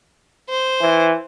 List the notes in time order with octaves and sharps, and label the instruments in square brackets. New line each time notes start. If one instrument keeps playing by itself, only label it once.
[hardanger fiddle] C5
[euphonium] E3